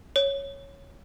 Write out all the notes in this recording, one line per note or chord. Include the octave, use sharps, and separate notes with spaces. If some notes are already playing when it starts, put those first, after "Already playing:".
C#5